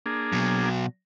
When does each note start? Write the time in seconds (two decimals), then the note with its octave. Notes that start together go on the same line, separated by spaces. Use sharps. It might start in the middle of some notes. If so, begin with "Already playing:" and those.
0.06 A#3 D4 G#4
0.32 B2 F#3